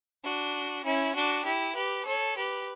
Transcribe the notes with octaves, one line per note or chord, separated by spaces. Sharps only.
D4 F#4
C#4 E4
D4 F#4
E4 G4
G4 B4
A4 C#5
G4 B4